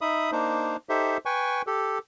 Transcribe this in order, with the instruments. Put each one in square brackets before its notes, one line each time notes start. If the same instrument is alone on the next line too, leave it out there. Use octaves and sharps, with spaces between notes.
[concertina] D#4 E5 B5 D#6
A#3 D4 D#4 C5
D#4 G4 A4 C5 E5
B4 G5 G#5 C#6
G4 A4